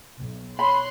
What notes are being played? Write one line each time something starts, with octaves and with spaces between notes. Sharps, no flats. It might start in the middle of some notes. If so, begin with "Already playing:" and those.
B1
C#5 B5 C6 F#6